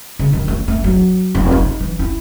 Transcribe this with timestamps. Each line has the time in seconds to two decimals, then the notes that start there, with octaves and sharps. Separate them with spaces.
0.19 C#3
0.33 D#3
0.48 A3
0.68 A3
0.84 F#3
1.35 F1
1.52 D#4
1.80 E3
1.99 E4